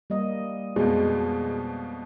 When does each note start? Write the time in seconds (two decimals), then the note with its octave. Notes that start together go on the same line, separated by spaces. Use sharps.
0.10 G3 A#3 D#5
0.76 F2 B2 G#3